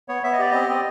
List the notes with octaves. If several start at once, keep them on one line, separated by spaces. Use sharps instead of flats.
B3 C#5
B3 E5
D#5
G4 D5
C4 D#5
C4